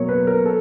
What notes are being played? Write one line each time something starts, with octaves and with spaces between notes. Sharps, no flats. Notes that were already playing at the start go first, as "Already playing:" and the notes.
Already playing: B2 F#3 A#3 C#5
B4
A#4
A4